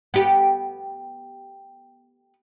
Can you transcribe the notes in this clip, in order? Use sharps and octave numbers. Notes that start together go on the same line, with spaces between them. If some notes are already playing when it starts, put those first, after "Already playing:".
B3 G4